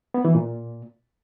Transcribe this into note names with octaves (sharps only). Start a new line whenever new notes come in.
B3
E3
A#2